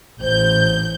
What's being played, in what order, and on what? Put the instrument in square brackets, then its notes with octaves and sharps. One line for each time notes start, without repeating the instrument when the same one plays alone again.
[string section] A1 G6 [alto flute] C5